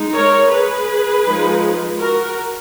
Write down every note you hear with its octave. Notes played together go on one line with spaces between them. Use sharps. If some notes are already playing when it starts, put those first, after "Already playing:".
Already playing: G#3 D#4
A#4 C#5
G#4 B4
F3 G#3 D#4
F#4 A#4